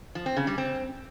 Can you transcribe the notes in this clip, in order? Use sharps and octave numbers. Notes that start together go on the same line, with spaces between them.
F3
C4
C#3
G3
C4